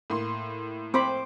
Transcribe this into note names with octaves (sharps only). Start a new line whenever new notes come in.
A2 A#3 C6
C4 C5 B5 D6